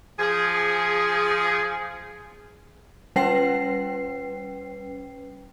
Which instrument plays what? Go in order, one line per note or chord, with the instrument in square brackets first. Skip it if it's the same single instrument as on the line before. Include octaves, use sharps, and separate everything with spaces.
[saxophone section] F3 G#4
[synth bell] G3 C#4 B4 G5 C7